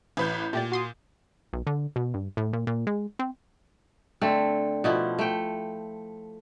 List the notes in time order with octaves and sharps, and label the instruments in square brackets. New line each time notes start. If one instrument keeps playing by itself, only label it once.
[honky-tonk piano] A1 B4 G6
[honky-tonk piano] A#2 [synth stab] A3 G4 D5
[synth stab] F#4 C6 D#6
[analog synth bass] B1
D3
B2
G2
A2
A#2
A#2
G#3
C4
[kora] D3 A3 C4
B2 F3 E4
A3 G5